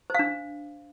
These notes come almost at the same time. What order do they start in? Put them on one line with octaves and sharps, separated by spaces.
C5 F5 D4